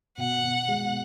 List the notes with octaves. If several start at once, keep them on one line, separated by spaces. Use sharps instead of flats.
B2 F#5
B2
G#3